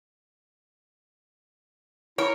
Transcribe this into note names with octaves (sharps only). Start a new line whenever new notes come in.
E4 A#4 C#5